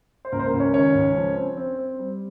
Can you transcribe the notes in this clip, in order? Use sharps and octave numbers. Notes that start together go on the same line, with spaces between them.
C5
C#2 A#3 A#4
C5
A#3 A#4
C#2
C#4 C#5
D#3 C#4 C#5
C#2
F3
C4
C4
C4
G3